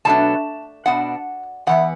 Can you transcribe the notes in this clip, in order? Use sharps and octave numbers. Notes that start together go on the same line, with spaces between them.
B2 F#3 A3 D4 A5
B2 B3 D4 F#5
E2 E3 B3 F#5